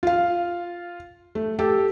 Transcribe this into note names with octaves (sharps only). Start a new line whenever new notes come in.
F4 F5
A3
G4 A4